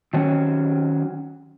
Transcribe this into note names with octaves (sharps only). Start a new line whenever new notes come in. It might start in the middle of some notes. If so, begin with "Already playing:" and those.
D#3 F#3 C4 C#4